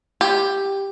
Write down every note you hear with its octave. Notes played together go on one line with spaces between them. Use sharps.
G4